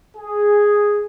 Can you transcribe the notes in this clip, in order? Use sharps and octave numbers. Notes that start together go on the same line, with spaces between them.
G#4